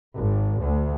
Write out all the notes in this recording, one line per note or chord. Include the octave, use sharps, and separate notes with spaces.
G#1
D2